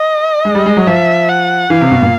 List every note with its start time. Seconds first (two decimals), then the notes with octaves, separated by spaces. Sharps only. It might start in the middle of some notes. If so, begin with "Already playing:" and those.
Already playing: D#5
0.45 G#3
0.55 G3
0.66 G#3
0.77 F#3
0.87 F3 E5
1.29 F#5
1.70 E3 F5
1.81 C3
1.91 B2
2.02 A#2